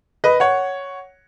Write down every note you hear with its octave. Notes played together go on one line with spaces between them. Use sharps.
B4 D#5
C#5 F#5